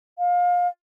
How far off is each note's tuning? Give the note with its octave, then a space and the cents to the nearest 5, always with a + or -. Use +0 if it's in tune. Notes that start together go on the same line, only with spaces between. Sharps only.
F5 +25